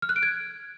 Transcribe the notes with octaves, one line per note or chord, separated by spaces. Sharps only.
F6
F#6
D7
G#6